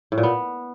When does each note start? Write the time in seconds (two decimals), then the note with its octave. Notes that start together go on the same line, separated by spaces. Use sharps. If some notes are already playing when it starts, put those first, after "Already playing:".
0.12 A2
0.18 A#2
0.23 B3